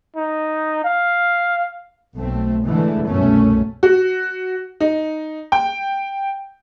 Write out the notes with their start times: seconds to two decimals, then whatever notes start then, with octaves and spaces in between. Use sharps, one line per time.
0.17 D#4
0.84 F5
2.16 B1 A3 C4
2.66 D3 E3 G#3 A3
3.08 C2 F#2 B2 A3 C#4
3.83 F#4
4.81 D#4
5.52 G5